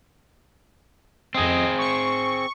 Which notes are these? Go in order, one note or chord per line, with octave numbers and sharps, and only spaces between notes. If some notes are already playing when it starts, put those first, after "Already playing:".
F2 C4 G#4 D#5
C#6